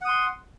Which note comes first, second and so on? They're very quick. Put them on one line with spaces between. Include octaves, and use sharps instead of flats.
F#5 D#6 C6